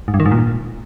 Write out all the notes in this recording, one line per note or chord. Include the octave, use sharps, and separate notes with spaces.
G#2
G2
D#3
G#2
A#2